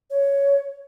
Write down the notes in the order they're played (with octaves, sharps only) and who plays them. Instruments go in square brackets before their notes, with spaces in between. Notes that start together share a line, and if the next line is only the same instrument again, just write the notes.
[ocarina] C#5